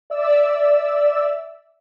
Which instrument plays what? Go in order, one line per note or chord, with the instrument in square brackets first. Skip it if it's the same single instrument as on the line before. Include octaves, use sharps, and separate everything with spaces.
[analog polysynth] D5 E5 E6